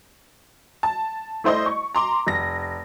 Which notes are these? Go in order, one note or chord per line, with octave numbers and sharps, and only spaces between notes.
A5
A3 E4 C5 D5 D#5
C#6
A#5 C6 D6
F1 A#6